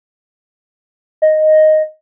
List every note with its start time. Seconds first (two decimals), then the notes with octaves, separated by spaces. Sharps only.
1.22 D#5